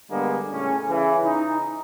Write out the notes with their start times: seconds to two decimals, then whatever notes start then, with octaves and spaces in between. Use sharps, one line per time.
0.11 D3 G3 G#3 A#3 B3
0.52 A2 C#3 C#4
0.89 C#3 E3
1.25 D#4